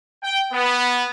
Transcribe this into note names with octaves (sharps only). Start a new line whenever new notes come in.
G5
B3